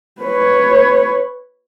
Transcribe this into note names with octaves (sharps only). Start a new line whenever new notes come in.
B4 C#5